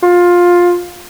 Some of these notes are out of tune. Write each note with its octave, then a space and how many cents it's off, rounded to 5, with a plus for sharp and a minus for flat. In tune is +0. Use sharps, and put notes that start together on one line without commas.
F4 +15